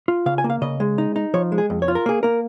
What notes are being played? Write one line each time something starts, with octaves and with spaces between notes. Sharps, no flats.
F4
C#3 F5
G#5
A#3
F5
C#3 D#5
G#3
D#4
D#4
F3 C#5
G#3
G#4
F2
C#5
F4
A#4
A#3 G#4
A#3 A#4